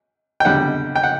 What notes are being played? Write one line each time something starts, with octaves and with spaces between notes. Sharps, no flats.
G5
E2 D3 G3 F#5
G5
F#5